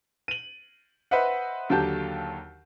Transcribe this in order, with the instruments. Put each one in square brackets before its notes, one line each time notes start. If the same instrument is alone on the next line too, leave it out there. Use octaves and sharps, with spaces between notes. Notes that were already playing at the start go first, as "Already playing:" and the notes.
[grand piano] D#7 F#7
B4 C5 D#5 E5 F#5
D#2 D3 F#3 G4 A5 G6